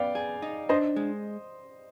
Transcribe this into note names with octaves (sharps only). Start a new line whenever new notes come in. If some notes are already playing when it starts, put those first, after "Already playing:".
Already playing: B3 D5 F5 G5
G#4
D#4
D4 C5 D#5
G#3